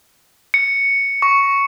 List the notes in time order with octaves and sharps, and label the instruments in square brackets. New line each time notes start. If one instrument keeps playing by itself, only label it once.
[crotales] C#7
C#6